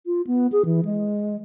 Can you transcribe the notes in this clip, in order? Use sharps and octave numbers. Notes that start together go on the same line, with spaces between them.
F4
B3
G#4
E3
G#3